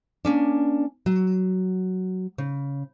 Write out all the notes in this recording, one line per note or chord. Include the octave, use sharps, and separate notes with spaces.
A#3 C#4 D4
F#3
C#3